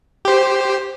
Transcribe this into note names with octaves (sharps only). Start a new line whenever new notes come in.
G4 C5